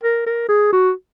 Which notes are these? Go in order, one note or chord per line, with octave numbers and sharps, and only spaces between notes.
A#4
A#4
G#4
F#4